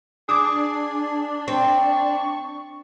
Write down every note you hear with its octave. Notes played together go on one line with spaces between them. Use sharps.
D4 G#4 D6 D#6
C4 C#6